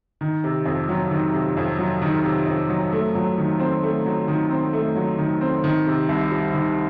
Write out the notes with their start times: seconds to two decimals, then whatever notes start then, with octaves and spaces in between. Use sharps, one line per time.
0.21 D#3
0.44 C3
0.66 F2
0.89 F#3
1.11 D#3
1.34 C3
1.57 F2
1.79 F#3
2.02 D#3
2.24 C3
2.47 F2
2.69 F#3
2.92 A3
3.15 F#3
3.38 D#3
3.60 C4
3.83 A3
4.06 F#3
4.28 D#3
4.50 C4
4.73 A3
4.96 F#3
5.18 D#3
5.41 C4
5.64 D#3
5.87 C3
6.09 C2
6.31 G3
6.54 D#3